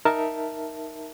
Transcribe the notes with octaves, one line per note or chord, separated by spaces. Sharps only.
D#4 A#4 E5 A5